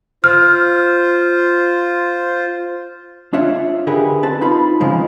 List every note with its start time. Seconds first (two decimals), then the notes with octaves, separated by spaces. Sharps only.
0.24 F4 C5 F6
3.33 D4 F4 C#5 E5 F#5
3.87 D3 G4 G#4 A#4 B4
4.23 C4 B4 A5
4.41 D#4 F4 B5
4.80 C#3 E3 F3 G#3